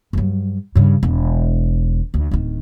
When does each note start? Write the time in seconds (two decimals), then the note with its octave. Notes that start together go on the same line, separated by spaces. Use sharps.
0.13 G2 F#3
0.75 G2 C#3
1.03 E1
2.14 D2
2.31 D1 D#3